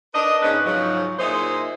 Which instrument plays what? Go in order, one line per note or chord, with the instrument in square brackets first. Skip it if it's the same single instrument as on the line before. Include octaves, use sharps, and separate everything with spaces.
[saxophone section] D4 A#4 B4 D#5
G#2 C#3 C#4 D4 B4 D#5
G#2 C#3 F3 F#3
A#2 D#4 E4 G#4 C5